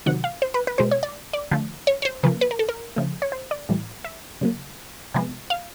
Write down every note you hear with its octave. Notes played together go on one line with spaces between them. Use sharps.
C3 D#3 F#3 F#5
F5
C5
B4
B4
B2 G#3 B3 C5
C#5
D5
D5
D3 F3 A3
C#5
C#5
C5
C#3 F3 A#3 B4
B4
A#4
A4
A#4
C#3 F3 A3
C#5
C5
D5
A2 E3 G3
E5
C#3 F#3 A#3
C3 F3 G#3 B3
F5